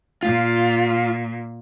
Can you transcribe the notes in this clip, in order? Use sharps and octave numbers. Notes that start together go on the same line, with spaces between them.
A#2 F4